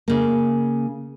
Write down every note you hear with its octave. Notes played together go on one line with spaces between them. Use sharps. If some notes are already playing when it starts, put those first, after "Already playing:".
C#3 A#3